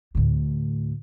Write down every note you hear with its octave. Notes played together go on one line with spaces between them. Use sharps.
D2 A2